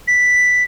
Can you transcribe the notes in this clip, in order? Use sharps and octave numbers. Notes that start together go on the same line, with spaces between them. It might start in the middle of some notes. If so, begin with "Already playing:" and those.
B6